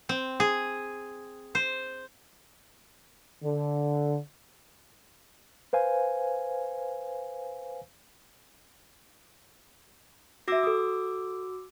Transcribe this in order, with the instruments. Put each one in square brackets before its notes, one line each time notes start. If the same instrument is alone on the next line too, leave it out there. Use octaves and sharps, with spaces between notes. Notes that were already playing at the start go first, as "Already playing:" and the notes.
[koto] C4
G#4
C5
[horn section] D3
[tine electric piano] B4 C5 F5 G#5
[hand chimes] F#4 D6 E6 [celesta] E5 A#6
[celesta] A4 D#6